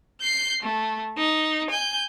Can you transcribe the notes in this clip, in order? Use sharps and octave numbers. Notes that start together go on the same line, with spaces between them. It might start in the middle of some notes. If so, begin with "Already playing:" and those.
G6 C7
A3
D#4
G#5 G6